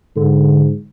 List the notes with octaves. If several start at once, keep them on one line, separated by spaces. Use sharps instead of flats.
G#2 D3